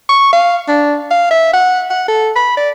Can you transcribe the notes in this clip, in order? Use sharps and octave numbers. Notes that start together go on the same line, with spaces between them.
C#6
F5
D4
F5
E5
F#5
F#5
A4
B5
D5